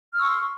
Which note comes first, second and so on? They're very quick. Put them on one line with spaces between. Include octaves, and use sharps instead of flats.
F6 E6 C#6 C6